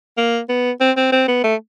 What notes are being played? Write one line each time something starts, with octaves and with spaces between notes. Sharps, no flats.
A#3
B3
C4
C4
C4
B3
A3